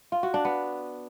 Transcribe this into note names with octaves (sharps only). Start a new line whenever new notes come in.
F4
F#4
D4
B3